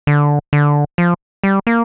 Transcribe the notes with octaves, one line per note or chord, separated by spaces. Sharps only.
D3
D3
F3
G3
A#3